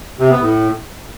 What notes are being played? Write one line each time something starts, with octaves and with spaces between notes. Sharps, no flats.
C3
B3
A2